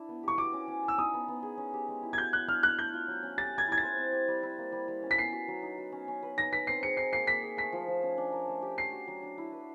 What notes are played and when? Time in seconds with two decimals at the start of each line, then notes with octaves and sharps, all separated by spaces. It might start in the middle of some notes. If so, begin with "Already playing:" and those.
Already playing: D4 E4
0.09 B3
0.23 G4 C#6
0.38 F#4 D6
0.53 C#4
0.68 C#4
0.83 A4
0.88 E6
0.98 D#4 D#6
1.14 B3
1.28 B3
1.43 G#4
1.58 C#4
1.73 G4
1.88 G#3
2.03 E4
2.13 G#6
2.18 F#4 G6
2.32 C#5 F#6
2.47 D4 F6
2.63 A4 F#6
2.78 A3 G6
2.93 F4
3.08 F#3
3.23 C#4
3.37 G4 A6
3.53 E5 G#6
3.68 E4 G#6
3.78 A6
3.83 C5
3.98 C4
4.13 G4
4.28 G3
4.43 E4
4.58 A#3
4.72 G3
4.88 G3
5.03 C#4
5.11 B6
5.18 B3 C7
5.33 F#4
5.48 F#3
5.63 D#4
5.78 F#4
5.92 C#4
6.08 C#4
6.23 B4
6.38 D#4 A#6
6.52 B4 B6
6.67 C4 C7
6.83 G#4 C#7
6.97 D#4 C7
7.13 A#3 C7
7.27 A#3 B6
7.43 G#4
7.57 A3 B6
7.72 F3
7.88 F3
8.03 C#4
8.18 D4
8.32 A#4
8.48 A3
8.62 G4
8.78 A3 C7
8.93 F#4
9.08 F#3
9.23 D4
9.38 E4
9.52 B4